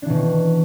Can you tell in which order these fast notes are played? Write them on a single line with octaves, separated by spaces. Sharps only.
D4 E3 B2 D#3